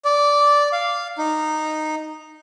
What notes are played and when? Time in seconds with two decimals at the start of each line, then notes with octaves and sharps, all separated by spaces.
0.05 D5
0.73 F5
1.18 D#4